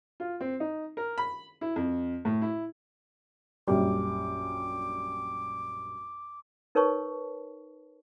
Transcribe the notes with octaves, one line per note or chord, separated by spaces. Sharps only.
F4
C4
D#4
A#4
B5
E4
F2
A2
E4
A#1 F#2 G3 D6
D#4 A#4 B4 C#5 A5 C#6